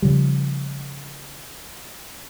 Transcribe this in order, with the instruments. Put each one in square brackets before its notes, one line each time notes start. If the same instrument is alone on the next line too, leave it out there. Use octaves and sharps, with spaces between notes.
[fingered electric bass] C#3 F3 G3